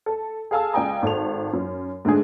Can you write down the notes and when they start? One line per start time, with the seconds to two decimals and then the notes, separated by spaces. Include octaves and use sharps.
0.06 A4
0.51 G#4 A4 F5 G#5 A5 E6
0.73 C#2 D5 G5 G#5 A#5 D#6
1.02 G#1 A4 F7
1.53 F#2
2.05 G#2 D3 A3 D4 G#4